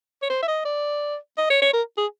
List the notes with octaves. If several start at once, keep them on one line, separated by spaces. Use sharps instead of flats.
C#5
C5
E5
D#5
D5
D#5
C#5
C#5
A#4
G#4